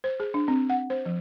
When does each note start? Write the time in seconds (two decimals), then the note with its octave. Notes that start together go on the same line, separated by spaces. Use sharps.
0.04 C5
0.20 G#4
0.34 D4
0.48 C4
0.70 F#5
0.90 C5
1.06 F3